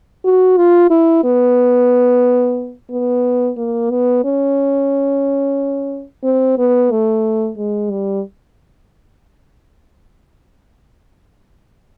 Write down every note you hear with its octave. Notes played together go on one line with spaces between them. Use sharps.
F#4
F4
E4
B3
B3
A#3
B3
C#4
C4
B3
A3
G#3
G3